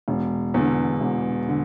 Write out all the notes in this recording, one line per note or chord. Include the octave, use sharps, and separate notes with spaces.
E1
E2 D3
E1
D3